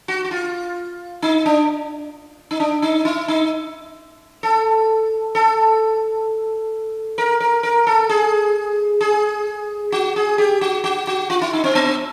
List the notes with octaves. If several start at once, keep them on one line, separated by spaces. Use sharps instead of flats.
F#4
F#4
F4
D#4
D4
D#4
D4
D#4
E4
D#4
A4
A4
A#4
A#4
A#4
A4
G#4
G#4
F#4
G#4
G4
F#4
F#4
F#4
F4
E4
D#4
C4
B3